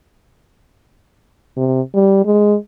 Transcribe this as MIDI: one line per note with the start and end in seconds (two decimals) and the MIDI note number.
1.57 1.81 48
1.94 2.22 55
2.25 2.56 56